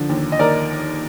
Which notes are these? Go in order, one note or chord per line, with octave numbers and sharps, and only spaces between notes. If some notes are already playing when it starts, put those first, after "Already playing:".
Already playing: D3 F3
D#2
D#5
D#2 A#4 D5